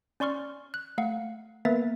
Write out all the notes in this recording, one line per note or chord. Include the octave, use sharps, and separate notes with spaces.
C#4 D5 C6 C#6 F6
F#6
A3 F5 F#5
A#3 B3 A#4 B4 E5 A6